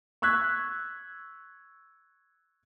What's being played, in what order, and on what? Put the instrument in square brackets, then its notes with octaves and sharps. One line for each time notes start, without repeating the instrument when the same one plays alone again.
[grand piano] C#6 E6 F#6 G#6 B6